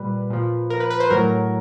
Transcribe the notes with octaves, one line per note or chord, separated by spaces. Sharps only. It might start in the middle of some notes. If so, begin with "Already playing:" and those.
Already playing: A#2 G3 B4
A#2 F3
A#4
B4
B4
C5
A2 F#3 A#4